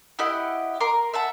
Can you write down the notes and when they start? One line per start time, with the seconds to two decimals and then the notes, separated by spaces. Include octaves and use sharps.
0.19 E4 G4 D#5 F#5
0.80 A#4 A#5 C6 D6
1.13 E5 F#5 A5